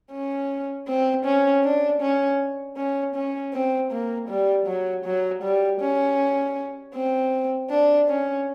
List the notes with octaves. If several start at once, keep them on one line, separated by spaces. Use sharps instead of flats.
C#4
C4
C#4
D4
C#4
C#4
C#4
C4
A#3
G3
F#3
F#3
G3
C#4
C4
D4
C#4